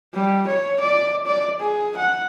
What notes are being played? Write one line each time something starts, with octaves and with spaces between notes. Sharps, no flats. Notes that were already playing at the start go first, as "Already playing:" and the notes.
G3
C#5
D5
D5
G#4
F#5